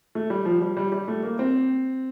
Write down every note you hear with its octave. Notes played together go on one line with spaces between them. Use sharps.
A3
G3
F3
G3
G3
G3
A3
A#3
C4